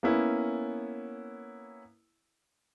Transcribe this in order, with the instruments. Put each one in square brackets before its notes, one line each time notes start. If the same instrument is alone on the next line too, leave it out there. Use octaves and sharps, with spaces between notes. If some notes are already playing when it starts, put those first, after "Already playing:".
[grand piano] A#3 B3 C#4 E4